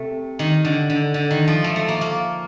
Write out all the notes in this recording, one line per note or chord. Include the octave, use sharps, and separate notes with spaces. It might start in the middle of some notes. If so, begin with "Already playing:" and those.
Already playing: C3 A3
D#3
D3
D3
D3
D#3
F3
A3
A3
A#3
A#3